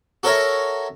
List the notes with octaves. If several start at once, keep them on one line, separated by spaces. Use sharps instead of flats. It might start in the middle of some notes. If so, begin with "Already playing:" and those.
F#4 A4 A#4 C#5 E5 A#5